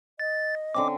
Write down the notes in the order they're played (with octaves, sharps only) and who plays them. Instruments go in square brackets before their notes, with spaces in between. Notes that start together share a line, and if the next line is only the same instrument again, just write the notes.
[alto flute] D#5 [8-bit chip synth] A6
[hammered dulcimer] D3 C4 C#4 [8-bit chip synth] D6